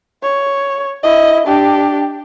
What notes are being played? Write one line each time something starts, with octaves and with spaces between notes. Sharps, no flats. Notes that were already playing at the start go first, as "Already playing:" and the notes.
C#5
E4 D#5
D4 G4